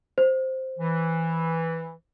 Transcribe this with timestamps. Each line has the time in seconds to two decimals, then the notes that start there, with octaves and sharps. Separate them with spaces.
0.18 C5
0.79 E3